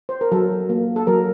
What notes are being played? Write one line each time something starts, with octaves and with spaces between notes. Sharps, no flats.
C5
A#4
F#3 A4
A#3
A4
F#3 A#4